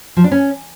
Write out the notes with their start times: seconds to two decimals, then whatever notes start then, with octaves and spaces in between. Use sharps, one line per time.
0.17 F3
0.24 D4
0.31 C#4